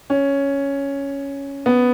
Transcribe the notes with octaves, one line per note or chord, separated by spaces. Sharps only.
C#4
B3